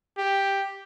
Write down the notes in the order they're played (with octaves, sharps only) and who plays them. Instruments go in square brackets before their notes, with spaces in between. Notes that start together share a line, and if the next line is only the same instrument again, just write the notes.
[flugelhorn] G4